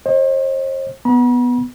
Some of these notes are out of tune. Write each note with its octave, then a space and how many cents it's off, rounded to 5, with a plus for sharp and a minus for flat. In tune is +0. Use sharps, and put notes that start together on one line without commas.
C5 +40 D#5 +0
B3 +0 B5 -45